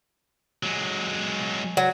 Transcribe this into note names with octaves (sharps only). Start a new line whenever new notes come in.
F#3 G#3
F#3